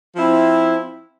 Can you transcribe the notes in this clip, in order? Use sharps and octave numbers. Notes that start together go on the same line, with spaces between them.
F3 C4 E4